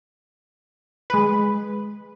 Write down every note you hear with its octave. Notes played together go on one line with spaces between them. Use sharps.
G#3 B4